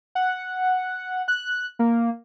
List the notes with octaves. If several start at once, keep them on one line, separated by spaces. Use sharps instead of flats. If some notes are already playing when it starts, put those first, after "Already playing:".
F#5
F#6
A#3